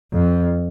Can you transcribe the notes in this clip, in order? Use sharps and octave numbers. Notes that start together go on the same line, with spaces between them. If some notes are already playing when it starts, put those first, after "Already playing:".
F2